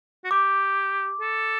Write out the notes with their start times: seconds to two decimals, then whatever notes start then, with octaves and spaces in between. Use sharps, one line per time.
0.25 F#4
0.31 G4 D6
1.21 A4